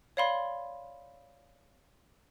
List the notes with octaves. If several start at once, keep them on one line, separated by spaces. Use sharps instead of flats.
C#5 D5 F5 B5 C6